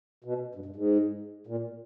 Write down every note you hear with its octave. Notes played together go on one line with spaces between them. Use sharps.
B2
G2
G2
G#2
A#2